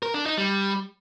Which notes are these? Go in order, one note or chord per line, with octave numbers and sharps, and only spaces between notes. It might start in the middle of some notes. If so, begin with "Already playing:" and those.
A#4
D4
D#4
G3